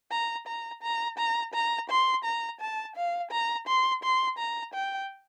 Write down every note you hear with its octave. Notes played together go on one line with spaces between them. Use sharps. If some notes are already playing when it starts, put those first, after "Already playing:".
A#5
A#5
A#5
A#5
A#5
C6
A#5
A5
F5
A#5
C6
C6
A#5
G5